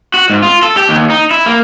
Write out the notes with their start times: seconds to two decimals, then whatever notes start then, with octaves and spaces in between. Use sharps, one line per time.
0.14 F#4
0.30 G#2
0.42 F4
0.63 A4
0.77 G4
0.89 D#2
1.10 D#4
1.31 E4
1.46 A#3